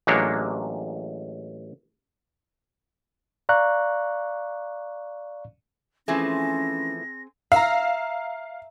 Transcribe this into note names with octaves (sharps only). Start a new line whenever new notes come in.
A1 F#3 G#3 A#3 D4 C#5
D5 F5 A#5 C#6 F#6
E3 F3 A3 C4 C#4 G#4 A#6
E5 F5 A#5